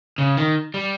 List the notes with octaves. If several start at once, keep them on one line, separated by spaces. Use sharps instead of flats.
C#3
D#3
G3